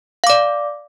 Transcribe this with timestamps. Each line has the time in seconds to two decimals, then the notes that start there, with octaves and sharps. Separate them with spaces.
0.24 F5
0.27 D6
0.30 D5